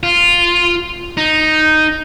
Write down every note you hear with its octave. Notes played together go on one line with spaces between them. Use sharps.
F4
D#4